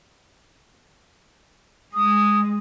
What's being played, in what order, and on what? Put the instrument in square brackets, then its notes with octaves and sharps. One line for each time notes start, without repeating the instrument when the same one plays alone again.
[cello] G#3 [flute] D#6